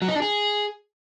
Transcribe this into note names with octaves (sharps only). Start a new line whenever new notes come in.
F#3
D#4
D4
G#4